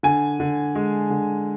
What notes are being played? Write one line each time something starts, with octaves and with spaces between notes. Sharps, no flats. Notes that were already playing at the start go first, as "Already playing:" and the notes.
D3 G#5
D3
G#3
D3